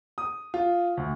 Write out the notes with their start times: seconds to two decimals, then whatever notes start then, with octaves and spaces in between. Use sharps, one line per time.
0.18 D#6
0.54 F4
0.97 D2